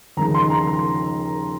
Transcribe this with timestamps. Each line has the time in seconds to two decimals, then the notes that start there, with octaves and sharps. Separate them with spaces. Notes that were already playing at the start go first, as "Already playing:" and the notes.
0.17 D#2 C#3 F3 G#3 D#4 A#5
0.34 C6
0.50 A#5
0.67 A#5